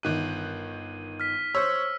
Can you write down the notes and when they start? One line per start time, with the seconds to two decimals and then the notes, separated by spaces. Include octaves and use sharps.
0.03 G1 D#3 F#6 D#7
1.20 F6 B6
1.55 C5 C#5 E6